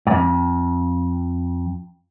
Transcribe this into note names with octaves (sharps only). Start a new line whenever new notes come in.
F2 G#2